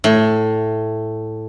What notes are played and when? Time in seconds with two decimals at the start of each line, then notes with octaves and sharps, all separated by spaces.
0.04 A2